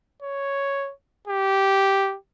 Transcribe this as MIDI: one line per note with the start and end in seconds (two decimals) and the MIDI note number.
0.23 0.92 73
1.28 2.16 67